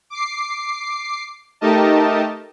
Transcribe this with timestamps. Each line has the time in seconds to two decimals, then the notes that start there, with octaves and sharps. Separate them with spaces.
0.10 D6 C7
1.61 A3 D#4 G4 A#4 D#5 A5